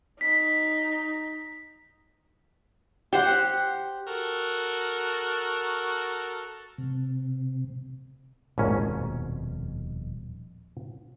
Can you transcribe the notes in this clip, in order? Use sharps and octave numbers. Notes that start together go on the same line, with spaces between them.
D#4 B6
G4 C5 F#5
F#4 A4 A#4
C3
D#1 A#1 F2 G#2 B2 C#4